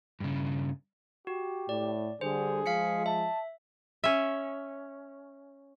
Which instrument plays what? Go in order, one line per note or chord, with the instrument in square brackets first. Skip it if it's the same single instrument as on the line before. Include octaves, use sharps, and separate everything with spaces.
[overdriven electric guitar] G2 C#3
[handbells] F#4 [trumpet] G4
[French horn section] A2 [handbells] D5
[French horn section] D3 G3 [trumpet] G#4 [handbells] C5
[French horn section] F3 G#3 [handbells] F5 B6 C#7
[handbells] E5 [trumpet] A5
[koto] C#4 E5